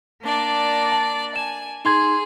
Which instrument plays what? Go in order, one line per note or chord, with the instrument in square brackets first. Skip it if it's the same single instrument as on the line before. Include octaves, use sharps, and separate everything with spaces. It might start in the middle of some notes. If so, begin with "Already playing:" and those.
[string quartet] A#3 D4 D5
[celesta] A5
[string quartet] G#5 [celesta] E7
[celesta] D#4 C6 G#6 [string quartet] G#4